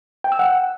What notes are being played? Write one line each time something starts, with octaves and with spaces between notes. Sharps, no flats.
G5
E6
F#5